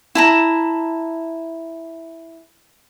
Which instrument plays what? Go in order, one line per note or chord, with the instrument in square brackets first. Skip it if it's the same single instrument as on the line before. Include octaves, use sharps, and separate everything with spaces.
[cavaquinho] E4 A5 A#5